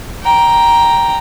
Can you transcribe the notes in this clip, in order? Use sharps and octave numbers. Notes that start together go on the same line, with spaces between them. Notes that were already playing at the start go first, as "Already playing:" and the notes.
G5 A#5